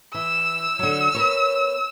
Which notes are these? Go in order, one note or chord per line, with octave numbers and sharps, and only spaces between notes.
E3 E6
D3 F#3
B3 A#4 C#5